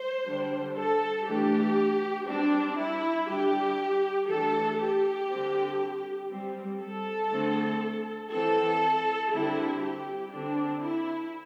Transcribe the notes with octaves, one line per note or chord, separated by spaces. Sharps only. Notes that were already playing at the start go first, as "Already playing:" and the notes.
Already playing: C5
D3 G3 D4
A4
E3 A3 D4 G4
G3 C4 D4
E4
D3 G3 D4 G4
E3 A3 D4 A4
G4
D3 G3 C4
G3 C4
A4
D3 A3 C4
E3 C4 A4
D3 G3 C4 E4
G4
D3 C4 D4
E4